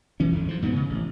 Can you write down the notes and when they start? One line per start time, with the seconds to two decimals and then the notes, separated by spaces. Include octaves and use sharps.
0.20 D2 E3 C#4
0.32 G#1 E2 D3
0.48 G#2 F3
0.61 D2 G#2 G#3 B3
0.76 C#3
0.89 A1